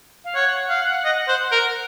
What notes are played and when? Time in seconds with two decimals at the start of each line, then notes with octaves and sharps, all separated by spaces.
0.25 F5
0.35 C#5 F#5
0.70 F5
1.05 D#5
1.28 C5
1.52 A#4